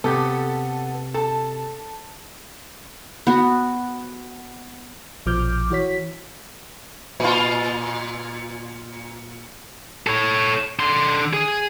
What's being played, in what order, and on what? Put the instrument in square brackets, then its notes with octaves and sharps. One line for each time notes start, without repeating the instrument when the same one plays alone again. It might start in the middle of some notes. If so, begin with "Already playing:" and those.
[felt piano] C3 [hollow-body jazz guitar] B3 G4 [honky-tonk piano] A4
[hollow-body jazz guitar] A4 [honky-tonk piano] A5
[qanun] B3 F#4
[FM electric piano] A#1 B2 F3 D6 F6 G6
E3 F#4 C#5 B6
[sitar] A#2 F4
[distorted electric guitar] A4 C#5
D3 C6
G#4